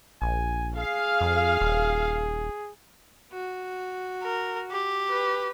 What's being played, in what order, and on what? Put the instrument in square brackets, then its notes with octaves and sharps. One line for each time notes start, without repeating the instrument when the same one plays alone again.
[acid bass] A#1 [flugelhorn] G#5
[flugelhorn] G#4 [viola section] F5
[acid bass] F2
D#1
[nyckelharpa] F#4
[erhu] A#4
G4
[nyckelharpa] B4